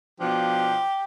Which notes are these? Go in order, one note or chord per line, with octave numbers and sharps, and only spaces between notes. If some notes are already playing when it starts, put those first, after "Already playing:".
B2 F3 D4 G4 F5